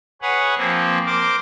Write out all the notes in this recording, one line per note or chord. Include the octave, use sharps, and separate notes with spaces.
G#4 B4 C#5 F#5
F3 A#3 C4
A#4 C5 D6